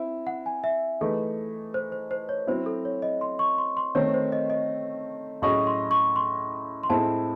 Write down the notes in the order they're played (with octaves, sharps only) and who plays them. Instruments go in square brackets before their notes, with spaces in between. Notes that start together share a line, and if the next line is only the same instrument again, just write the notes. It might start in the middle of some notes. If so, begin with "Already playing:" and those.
Already playing: [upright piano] C4 E4 [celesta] E5
[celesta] F#5
G#5
E5
[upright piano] E3 A3 D#4 G#4 [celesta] A4
[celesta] C5
C5
C5
C#5
[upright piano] F#3 C4 E4 [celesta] C5
[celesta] A4
C#5
D#5
C6
C#6
C6
C6
[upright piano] D#3 A3 C4 [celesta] C#5
[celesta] C5
D#5
D#5
[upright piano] A2 F#3 C#4 G#4 D#5 [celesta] C#6
[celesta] C6
C#6
C6
C6
[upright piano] A2 G#3 C4 E4 G#4 [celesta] A5